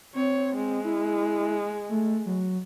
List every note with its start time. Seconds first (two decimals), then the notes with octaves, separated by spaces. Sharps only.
0.15 C4 C#5
0.56 G#3
0.85 E4
1.89 A3
2.26 F#3